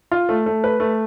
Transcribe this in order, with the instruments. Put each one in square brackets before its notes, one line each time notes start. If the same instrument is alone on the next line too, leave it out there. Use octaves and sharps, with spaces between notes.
[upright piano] F4
A3
A3
B4
A3